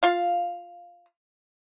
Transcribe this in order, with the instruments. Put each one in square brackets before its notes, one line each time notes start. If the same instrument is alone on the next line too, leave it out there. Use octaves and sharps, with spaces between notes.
[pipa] F4 F5